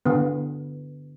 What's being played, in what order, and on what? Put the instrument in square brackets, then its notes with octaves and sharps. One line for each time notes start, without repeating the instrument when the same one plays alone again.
[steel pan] D3 B3